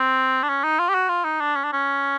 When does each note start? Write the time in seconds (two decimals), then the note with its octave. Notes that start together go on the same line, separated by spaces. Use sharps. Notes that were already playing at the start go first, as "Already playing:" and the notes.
Already playing: C4
0.43 D4
0.49 C#4
0.64 D#4
0.79 F4
0.89 G4
0.95 F#4
1.09 F4
1.25 D#4
1.41 D4
1.56 C#4
1.64 D4
1.73 C#4